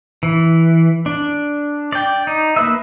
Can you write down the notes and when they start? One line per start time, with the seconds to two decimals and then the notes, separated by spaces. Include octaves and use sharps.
0.23 E3
1.06 D4
1.92 D5 G5
2.27 D#4
2.56 A#3 B4 E5